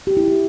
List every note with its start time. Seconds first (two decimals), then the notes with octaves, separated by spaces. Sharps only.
0.07 G4
0.17 E4
0.28 G4